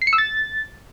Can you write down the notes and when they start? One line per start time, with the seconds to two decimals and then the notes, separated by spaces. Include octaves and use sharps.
0.02 C7
0.07 C#7
0.13 E6
0.18 A6